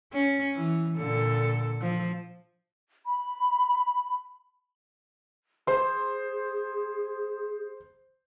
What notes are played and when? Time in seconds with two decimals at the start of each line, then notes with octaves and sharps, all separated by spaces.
0.13 C#4
0.56 E3
0.97 A#2 D3 A4
1.81 F3
3.06 B5
5.67 G#4 C5 C6